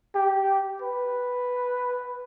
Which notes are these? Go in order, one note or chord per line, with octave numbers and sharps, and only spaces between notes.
G4
B4